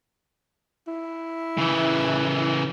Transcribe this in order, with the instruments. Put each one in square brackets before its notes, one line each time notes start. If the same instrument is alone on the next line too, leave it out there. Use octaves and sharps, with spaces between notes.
[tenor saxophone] E4
[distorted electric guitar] C#3 E3